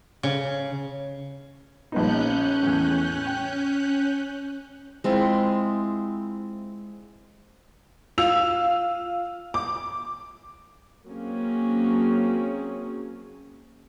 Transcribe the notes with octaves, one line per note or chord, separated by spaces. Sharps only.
C#3
A#1 B3 C#4 D#4 F#6 G6
E2 A2
G5
G#3 C4 E4 F4
F4 E6 F7
D6
F#3 A#3 C4 C#4 G#4